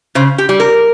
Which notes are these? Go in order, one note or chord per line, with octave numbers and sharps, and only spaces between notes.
C#3 C5
G4
G3
A#4